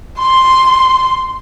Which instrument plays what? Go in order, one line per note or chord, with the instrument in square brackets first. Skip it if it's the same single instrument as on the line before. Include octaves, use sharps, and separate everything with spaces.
[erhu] C6